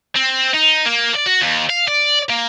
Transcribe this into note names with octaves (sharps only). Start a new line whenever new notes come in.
C4
D#4
A#3
D5
F#4
D#2
F5
D5
A#3